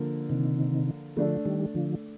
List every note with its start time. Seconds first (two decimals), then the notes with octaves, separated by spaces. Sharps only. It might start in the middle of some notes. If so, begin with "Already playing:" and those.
Already playing: D3 F3 A#3 A#4
0.30 C3 D#3
1.16 D3 F3 A3 D4 A4
1.45 D#3 G3
1.75 D3 F3